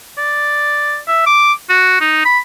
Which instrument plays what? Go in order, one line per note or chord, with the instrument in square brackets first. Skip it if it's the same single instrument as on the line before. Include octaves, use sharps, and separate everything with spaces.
[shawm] D5
E5
D6
F#4
D#4
B5